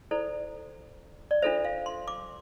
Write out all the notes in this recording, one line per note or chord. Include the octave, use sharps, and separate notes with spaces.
E4 A4 C5 D5
D5
D4 F4 A4 C5 E5
F5
C6
D6